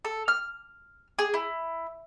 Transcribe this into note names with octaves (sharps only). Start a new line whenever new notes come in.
A4
F6
G#4
E4